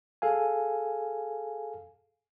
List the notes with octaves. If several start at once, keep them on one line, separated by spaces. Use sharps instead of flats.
G#4 A4 F5 G#5